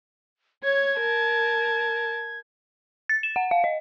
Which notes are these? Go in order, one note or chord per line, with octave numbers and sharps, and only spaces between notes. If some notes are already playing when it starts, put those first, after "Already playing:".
C#5 G#6
A#4 A5
A6
E7
F#5
F5
D#5